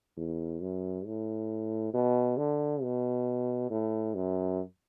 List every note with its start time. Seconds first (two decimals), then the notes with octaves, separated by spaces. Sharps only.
0.17 E2
0.61 F#2
1.06 A2
1.94 B2
2.37 D3
2.83 B2
3.70 A2
4.15 F#2